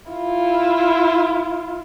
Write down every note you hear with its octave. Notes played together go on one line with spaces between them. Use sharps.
E4 F4